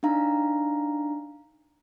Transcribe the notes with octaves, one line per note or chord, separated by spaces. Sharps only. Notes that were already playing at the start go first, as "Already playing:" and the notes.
D4 D#4 F5 A#5